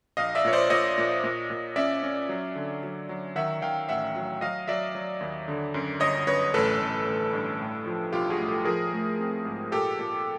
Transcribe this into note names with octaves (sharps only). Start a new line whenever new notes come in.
A#1 D#5 F5
D5 E5
A#2 C#5
C5 D5
A#2 C#5 D#5
A#2
A#2
A#2
C#4 D5 E5
C#4
F#3
D3
F#3
F#3
D#3 E5 F#5
D#3 F5 G5
A1 E5 F#5
F#3
F#3 D#5 F5
F#3 D5 E5
F#3
D#2
D3
F#2
G1 C#5 D#5
F#2 B4 C#5
A1 A4 B4
A1
A1
G2
A2
F3
B1 F4 G4
F#4 G#4
A2
G4 A4
F3 G#4 A#4
A3
C4
G#2
A#2 G4 A4
A#2